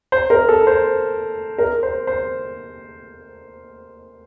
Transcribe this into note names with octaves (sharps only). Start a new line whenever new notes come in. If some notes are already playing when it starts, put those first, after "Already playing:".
C5
A#4
A4
C5
A#4
C5
C5